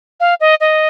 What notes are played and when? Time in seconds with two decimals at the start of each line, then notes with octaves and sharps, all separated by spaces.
0.20 F5
0.41 D#5
0.61 D#5